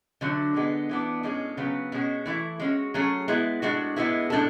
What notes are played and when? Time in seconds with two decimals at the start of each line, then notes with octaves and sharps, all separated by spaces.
0.21 D3 F#3 A3 D4
0.54 D3 G#3 B3
0.89 E3 B3 D4
1.23 A2 G#3 C#4 G#4
1.57 C#3 F#3 B3
1.92 B2 G#3 C#4 F#4
2.26 E3 A3 E4
2.60 G#3 C#4 F#4
2.94 F#3 A3 C#4 G#4
3.28 G#3 B3 E4
3.62 A2 G#3 D4 F#4
3.96 A2 G#3 B3 E4
4.30 A2 G#3 D4 A4